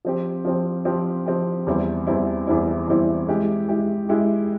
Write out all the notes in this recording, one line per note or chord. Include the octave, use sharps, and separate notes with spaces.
F3 C4 G4
F3 C4 G4
F3 C4 G4
F3 C4 G4
E2 E3 G3 C4 E4
E2 E3 G3 C4 E4
E2 E3 G3 C4 E4
E2 E3 G3 C4 E4
G#3 E4 G4
G#3 E4 G4
G#3 E4 G4